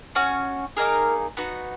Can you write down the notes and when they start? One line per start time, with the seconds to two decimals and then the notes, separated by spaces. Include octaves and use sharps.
0.15 C#4 F#4
0.77 A#3 D#4 G#4 A#4
1.37 B3 D#4 F#4